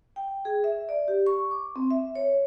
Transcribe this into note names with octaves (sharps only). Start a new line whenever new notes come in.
G5
G#4
E5
D5
G4
C#6
D6
C4
E5
C#5